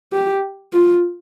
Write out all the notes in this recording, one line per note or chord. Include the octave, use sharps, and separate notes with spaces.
G4
F4